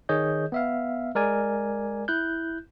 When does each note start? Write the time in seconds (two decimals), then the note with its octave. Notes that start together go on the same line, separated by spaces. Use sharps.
0.09 D#3 G#4 C#5 D#5 G6
0.52 B3 E5 F5
1.15 G#3 A#4 D5 G#5
2.08 E4 F#6 G6